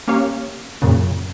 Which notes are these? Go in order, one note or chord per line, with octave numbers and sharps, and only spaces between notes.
A#3 C#4 G4 C#5 F5
F#2 A#2 C#3